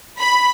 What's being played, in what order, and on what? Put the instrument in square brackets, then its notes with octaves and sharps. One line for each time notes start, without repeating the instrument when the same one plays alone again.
[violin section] B5